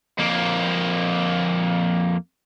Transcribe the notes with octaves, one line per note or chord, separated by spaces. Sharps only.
F2 A#3